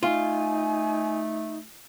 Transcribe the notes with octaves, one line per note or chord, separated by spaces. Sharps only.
A3 D#4 F4 G#5